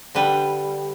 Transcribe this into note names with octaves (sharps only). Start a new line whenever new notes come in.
D3 G3 B4